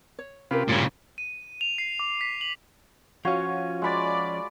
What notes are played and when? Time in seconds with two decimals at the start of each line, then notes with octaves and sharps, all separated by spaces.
0.19 C#5
0.51 C3 C#4 F4 G4 A#4 B4
0.68 G2 A#2 C#3
1.18 D#7
1.61 F7
1.78 C7
1.99 D6
2.21 B6
2.41 F#7
3.25 F3 C#4 F4 F#4 C#5
3.82 G#3 D5 B5